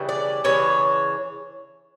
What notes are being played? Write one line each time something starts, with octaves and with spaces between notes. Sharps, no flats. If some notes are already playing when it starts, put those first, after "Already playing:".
Already playing: C#3 E3 G3 D4
D5
C#3 E3 D4 C#5